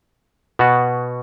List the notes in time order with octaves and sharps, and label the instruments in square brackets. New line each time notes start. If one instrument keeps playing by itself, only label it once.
[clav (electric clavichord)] B2 B3 F#4